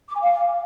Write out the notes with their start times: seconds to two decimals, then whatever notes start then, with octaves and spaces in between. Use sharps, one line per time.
0.08 D6
0.14 G#5
0.20 F5